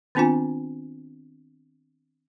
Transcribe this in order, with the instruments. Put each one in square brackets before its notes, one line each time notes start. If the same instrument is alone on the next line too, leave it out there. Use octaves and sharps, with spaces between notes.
[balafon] D#3 B3 C4 D4 F4 G#5